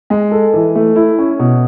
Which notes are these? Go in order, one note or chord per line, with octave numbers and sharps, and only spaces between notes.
G#3
A4
E3
A3
E4
C#4
B2